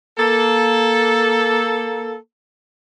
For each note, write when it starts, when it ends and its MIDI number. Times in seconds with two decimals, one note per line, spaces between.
0.19 2.15 58
0.19 2.15 69